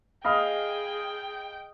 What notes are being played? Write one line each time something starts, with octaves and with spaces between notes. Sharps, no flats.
G#4 D#5 F5 G5 B5 F6